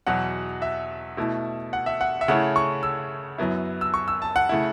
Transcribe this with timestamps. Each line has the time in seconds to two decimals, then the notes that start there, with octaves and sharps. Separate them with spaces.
0.07 E2 B2 F#3 F#5
0.62 E5
1.17 B2 A3 E4
1.73 F#5
1.86 E5
2.01 F#5
2.21 E5
2.28 C#3 A3 C#4 E4 F#5
2.56 C#6
2.83 E6
3.38 F#2 F#3 B3 E4
3.81 E6
3.94 C#6
4.08 E6
4.22 A5
4.36 F#5
4.49 C#3 A3 E4